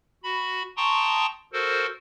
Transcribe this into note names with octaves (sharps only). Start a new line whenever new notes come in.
F#4 B5
G5 A5 A#5 C6 C#6 D#6
F#4 A4 A#4 C5